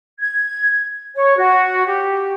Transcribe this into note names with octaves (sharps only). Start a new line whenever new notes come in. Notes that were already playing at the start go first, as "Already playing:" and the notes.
G#6
C#5
F#4
G4